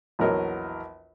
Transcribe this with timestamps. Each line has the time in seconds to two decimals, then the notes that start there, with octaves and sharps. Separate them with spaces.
0.19 A#1 E2 F#3 A#4 C#5 D#5